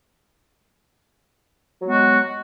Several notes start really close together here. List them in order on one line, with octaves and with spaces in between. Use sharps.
F#3 G#3 B3 F#4